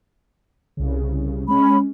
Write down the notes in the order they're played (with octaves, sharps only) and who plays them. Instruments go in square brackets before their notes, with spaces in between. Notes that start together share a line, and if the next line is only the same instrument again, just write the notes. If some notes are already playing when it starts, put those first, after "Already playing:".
[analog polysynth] C2 C#3
[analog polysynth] G#3 C#4 [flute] B5